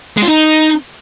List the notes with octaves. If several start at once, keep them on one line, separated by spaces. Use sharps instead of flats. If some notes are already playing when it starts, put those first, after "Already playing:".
G#3
F4
D#4